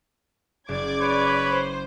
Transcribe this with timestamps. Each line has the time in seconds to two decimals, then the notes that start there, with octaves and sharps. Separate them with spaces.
0.69 F#1 D5 D6 G#6
1.00 B4 C#5 B5
1.50 C5